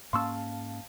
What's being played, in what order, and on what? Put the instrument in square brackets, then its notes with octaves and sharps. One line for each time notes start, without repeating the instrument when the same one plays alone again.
[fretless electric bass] G#2 A#3 C#4 [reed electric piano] F5 A5 [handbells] C6 C#6 E6